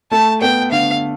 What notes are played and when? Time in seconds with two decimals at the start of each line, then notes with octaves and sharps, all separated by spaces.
0.11 A3 A5
0.41 B3 G5
0.72 D3 F5